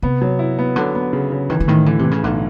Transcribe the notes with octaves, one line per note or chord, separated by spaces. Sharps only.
C3 B3
F#3
E4
B3
D3 F#3
B3
C#3
C#3
D#3 E3
D3
A2 D#3
D3 E3
C3
E3
C#3
B1 D3